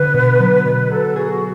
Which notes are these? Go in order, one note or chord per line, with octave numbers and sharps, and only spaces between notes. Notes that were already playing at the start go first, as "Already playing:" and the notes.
Already playing: D3 B4
B2
F#3
B2 B4
B4
F#3 A4
F#4 G#4